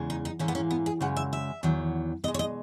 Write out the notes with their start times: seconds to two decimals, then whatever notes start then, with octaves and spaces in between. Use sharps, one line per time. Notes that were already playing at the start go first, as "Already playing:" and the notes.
Already playing: E2 C#3 G#3
0.10 D#4
0.25 D#4
0.39 G#2 E3 A#3 C#4
0.48 B3
0.55 C#4
0.71 B3
0.86 G#4
1.01 F#2 C#3 G#3 F#5
1.17 E5
1.33 E5
1.63 E2 D#3 F#3
2.24 B2 D#5
2.28 G#3
2.34 C#5
2.39 D#5